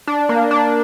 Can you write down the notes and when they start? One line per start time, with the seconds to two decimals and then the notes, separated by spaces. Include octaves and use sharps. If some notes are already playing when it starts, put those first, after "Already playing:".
0.07 D4
0.29 A#3
0.51 D4